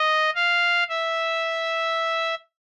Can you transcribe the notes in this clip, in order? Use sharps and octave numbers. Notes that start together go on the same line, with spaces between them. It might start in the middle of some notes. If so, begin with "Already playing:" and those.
Already playing: D#5
F5
E5